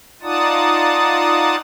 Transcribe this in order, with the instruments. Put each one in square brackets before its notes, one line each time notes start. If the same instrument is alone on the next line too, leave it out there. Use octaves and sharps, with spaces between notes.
[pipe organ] D#4 F4 D5 F#5 A5 D#6